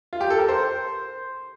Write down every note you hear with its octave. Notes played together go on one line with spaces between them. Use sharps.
F4
G4
A4
A#4
C5